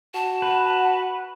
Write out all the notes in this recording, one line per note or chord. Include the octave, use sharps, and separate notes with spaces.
F#4 A5
B4 F#5